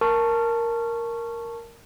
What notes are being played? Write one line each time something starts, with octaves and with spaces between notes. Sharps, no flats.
A#4 A5 C#6